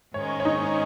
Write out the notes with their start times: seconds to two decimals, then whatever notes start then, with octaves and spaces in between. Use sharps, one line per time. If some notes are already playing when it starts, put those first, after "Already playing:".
0.14 G#2 D#3 G#3 C#4 C#5
0.40 C#5
0.45 D#4 D#5